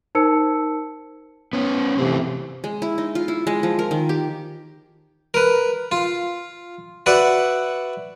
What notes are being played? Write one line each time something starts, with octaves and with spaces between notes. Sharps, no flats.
D#4 A#4 C5 A5 E6 C#7
B3 C#4
C3 E3 A3 C4
G#3
E4
D#4
F4
E4
G#3
F3
A#4
D#3
G4
A#4 B4
F4
F#4 B4 D5 E5 F#5